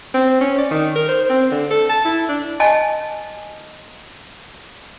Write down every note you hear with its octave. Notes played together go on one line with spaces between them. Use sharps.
C4
C#4
D5
D#3
A#4
C5
C4
D3
A4
A5
E4
D4
D#5 G#5 A5